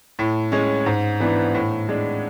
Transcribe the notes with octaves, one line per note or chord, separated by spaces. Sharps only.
A2
G#3 C#4
G#2
E3 B3 D4
A2
G#3 D4